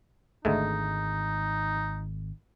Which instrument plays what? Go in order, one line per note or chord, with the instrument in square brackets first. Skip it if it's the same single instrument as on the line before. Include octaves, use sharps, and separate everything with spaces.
[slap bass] G#1 [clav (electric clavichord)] D2 G#3 A3 [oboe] D#4